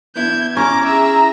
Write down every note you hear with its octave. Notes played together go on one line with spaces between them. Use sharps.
B3 D4 E4 G6 G#6
C#4 A#5 D6
G#4 E5 A#5